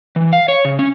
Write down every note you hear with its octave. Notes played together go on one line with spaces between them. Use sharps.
E3
F5
C#5
C#3
C#4